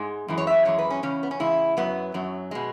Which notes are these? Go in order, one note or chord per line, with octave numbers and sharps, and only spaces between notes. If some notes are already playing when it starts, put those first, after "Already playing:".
Already playing: G#2 G#3
F#2 E3 G#3
C#5
E5
F#2 E3 G#3 C#5
B4
C#4
E2 C#3 C#4
B3
C#4
E2 C#3 G#3 E4
F#2 F#3 B3
F#2 F#3
B2 G#3